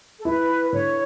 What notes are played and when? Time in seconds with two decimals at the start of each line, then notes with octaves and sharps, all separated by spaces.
0.20 A4
0.25 E4 B4
0.72 D3 C#5